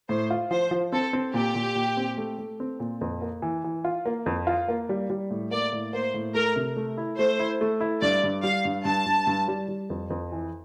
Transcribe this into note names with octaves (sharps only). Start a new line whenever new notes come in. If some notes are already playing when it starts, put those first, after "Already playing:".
A2 C5
F4
F3 C5
F3
C4 A4
C4
A#2 G4
A#2
A#2
C4
A3
A3
C4
A#2
F2
A#3
E3
E3
F4
A#3
F2
F4
A#3
G3
G3
A2
A#3 D5
A2
A#3 C5
A2
A3 A#4
C3
A3
E4
A3 C5
E4
A3
E4
G2 D5
G2
G3 F5
G2
G2 A5
G2
G2
G3
G3
F2
F2
E3